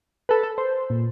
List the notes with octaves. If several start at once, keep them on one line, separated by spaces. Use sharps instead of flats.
A4 B4
A4
C5
A#2